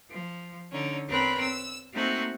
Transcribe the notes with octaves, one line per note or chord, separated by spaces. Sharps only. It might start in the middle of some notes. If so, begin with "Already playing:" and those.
F3
D3 C#4 D#4
E2 C4 A#4 B4 C#5 B5
E6
A3 A#3 C4 D#4 F#4